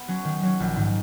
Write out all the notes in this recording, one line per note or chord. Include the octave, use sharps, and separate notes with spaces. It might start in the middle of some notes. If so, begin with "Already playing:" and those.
Already playing: B3
F#3 C#4
D#3
F#3 C#4
A#1
G#2 D#3